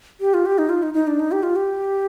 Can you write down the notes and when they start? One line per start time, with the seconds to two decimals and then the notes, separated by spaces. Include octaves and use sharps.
0.21 G4
0.34 F4
0.46 G4
0.58 D#4
0.69 F4
0.83 D#4
0.94 D#4
1.07 D4
1.20 D#4
1.32 G4
1.43 F4
1.56 G4